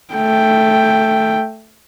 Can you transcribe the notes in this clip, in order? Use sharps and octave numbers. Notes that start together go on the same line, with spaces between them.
A3 G5